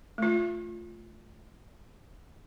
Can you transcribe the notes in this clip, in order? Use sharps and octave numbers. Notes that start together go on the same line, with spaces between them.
A3 F4